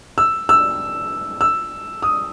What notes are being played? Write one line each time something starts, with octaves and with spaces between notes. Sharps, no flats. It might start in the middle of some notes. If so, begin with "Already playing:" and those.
E6
E6
E6
D#6